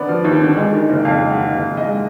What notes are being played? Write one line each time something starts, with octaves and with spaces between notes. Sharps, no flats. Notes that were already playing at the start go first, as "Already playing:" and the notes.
Already playing: D#2 D3 B3 D5
F3
D#2
D3
G#3
D#3
F#1
F2 F5
G#3
F#5
D#3
F#1 F5
F2 F5
D#5
G#3